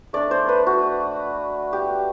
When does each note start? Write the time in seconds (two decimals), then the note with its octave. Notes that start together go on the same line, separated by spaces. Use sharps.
0.13 A3 D4 D5
0.31 C5
0.48 B4
0.67 F#4
1.73 G4